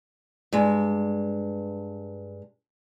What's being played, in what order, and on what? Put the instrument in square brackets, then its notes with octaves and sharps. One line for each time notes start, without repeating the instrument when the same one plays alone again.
[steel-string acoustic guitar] G2 G#3